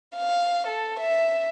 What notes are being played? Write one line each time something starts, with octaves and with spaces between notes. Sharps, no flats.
F5
A4
E5